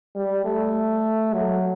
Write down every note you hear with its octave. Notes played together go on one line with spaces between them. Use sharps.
G3
A3
F#3